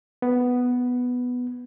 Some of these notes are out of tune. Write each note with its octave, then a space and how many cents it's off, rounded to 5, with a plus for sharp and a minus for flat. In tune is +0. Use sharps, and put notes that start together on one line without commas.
B3 +0